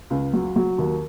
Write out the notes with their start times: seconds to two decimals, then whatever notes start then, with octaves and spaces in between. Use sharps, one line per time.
0.10 C#2
0.33 F#3
0.56 F#3
0.78 D#2